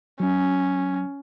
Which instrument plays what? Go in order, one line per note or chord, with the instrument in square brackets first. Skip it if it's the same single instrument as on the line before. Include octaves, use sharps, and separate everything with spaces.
[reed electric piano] F#3 [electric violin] C#4